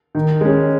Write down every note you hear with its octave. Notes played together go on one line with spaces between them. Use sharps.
D#3
G#3 C#4